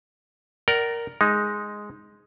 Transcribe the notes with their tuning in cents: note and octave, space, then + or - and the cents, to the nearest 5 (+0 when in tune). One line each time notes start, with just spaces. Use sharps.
A#4 +0 D5 +0 F#5 +40
G#3 +0 D#4 +0